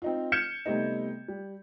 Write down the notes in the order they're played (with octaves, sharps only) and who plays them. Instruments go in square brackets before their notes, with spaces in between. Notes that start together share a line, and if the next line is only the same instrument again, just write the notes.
[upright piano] C4 D#4 F4
F6 G6 G#6 C#7 E7
C3 G3 A3 B3 D#4
G3